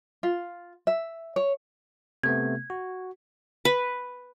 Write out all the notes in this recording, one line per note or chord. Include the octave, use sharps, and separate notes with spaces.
F4
E5
C#5
C3 A3 B3 G#6
F#4
B4